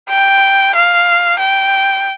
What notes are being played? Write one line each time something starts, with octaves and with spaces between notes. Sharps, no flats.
G5
F5
G5